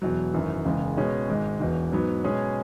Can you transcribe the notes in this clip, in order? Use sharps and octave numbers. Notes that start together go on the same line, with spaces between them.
E1 E2 B2 F#3
G#1 F#2 E3
F#1 E2 C#3 G#3
B2 G#3 C#4
G#1 G#2 G#3
E1 E2 B2
G#2 F#3 B3
B2 G#3 C#4 G#4